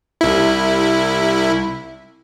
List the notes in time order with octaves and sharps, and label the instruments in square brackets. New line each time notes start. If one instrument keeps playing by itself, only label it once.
[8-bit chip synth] C2 E4